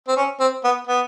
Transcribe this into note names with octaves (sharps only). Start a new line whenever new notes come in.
C4
C#4
C4
B3
B3